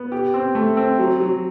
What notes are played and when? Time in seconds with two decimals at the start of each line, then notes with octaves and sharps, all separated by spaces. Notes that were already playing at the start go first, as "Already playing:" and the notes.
Already playing: B3
0.12 G4
0.34 C4
0.55 A3
0.77 C4
0.99 F#3
1.20 F#3